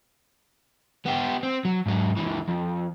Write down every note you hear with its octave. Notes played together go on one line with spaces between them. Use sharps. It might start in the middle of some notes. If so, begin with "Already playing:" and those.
B3 G4
C4
F#3
G#2 F#3
C#2 E3
F2